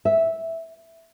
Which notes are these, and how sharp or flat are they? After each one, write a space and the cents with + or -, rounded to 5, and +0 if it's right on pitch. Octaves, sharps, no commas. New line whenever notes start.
E5 -5